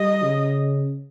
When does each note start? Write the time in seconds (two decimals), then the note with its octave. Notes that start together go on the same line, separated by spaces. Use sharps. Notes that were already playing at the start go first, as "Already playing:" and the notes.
Already playing: G3 D#5
0.23 C#3